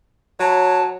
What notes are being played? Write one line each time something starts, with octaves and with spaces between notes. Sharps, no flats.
F#3 C#5 A5